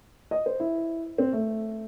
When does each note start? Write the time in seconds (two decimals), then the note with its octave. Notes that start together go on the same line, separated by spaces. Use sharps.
0.31 D#5
0.46 C5
0.60 E4
1.18 C4
1.33 A3